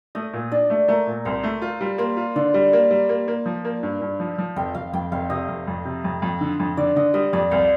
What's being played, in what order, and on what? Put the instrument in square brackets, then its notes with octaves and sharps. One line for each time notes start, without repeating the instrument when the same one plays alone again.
[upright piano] A3 [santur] D#5
[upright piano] A#2
[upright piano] D4 [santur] D5
[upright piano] A3
[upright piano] A3 [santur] A#4
[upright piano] A#2
[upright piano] C2 [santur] C5
[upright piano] A3
[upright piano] F4 [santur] C5
[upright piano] G3
[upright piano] A#3 [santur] C5
[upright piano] F4
[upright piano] D3 [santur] D5
[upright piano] G3
A#3
G3
A#3
A#3
F3
A#3
G2
G2
F3
F3
[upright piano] F1 [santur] G5
[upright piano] F1 [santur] F5
[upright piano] F2 [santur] G5
[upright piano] F1 [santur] F5
[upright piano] C3 [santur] D#5
[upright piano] F1
F2
C3
F2
F2
D3
F2
[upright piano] D3 [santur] D5
[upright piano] D3 [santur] D#5
[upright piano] G3 [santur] D#5
[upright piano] F2 [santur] D5
[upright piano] C2 [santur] F5